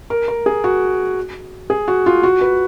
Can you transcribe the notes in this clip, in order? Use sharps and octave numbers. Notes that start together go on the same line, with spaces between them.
A#4
A#4
G#4
F#4
G#4
F#4
F4
F#4
B4